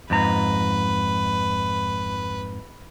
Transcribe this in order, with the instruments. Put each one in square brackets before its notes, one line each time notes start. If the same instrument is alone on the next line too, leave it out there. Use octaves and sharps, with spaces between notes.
[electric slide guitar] F2 G#2 A#5 [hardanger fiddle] B4